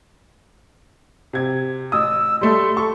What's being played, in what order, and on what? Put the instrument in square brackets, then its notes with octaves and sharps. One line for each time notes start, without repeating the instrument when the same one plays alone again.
[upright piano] C3 G#6
[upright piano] A1 D#6 [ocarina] E6
[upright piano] G3 A3 A4 [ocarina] C6
[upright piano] A4 C#6